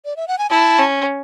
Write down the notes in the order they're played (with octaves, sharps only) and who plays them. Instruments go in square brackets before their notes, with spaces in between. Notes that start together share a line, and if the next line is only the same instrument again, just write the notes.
[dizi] D5
E5
F#5
G#5
[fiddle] E4 [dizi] A5
[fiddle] C#4